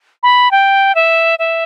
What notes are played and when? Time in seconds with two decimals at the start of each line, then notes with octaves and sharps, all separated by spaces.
0.23 B5
0.51 G5
0.95 E5
1.39 E5